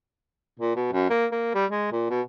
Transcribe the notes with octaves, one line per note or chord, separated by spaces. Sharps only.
A#2
B2
F#2
A#3
A#3
G3
G#3
A#2
B2